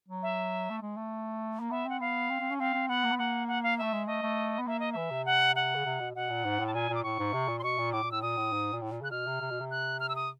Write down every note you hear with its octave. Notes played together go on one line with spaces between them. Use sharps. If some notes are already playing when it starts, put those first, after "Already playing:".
F#3
E5
A3
G#3
A3
A#3
B3 E5
C4 F#5
B3 F5
C4
C4
C#4
C4 F5
C4
B3 F#5
A#3
B3
A#3 F#5
F#5
F5
A3 E5
G#3
A3 D#5
A3
B3
A#3 E5
D#5
E3 E5
C3
F#5
F#5
C#3
C3
B2
B2 F#5
A#2
G#2
A2
A5
A#2 G#5
A#2
D6
A2 C#6
G#2
C3
A#2
C6
B2 C#6
A#2
A2 D6
A#2
A2 E6
A#2 D#6
A2
G#2
A#2
A2
A#2
C#3 F#6
B2 F6
C3
C3
B2
C3
F#6
F6
E6
D#6